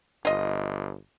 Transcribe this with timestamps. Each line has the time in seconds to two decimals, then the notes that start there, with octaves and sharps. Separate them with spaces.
0.25 G1 F4 D#5